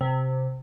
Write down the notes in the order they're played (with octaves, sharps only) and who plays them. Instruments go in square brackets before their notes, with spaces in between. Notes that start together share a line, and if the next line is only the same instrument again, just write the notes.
[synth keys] C3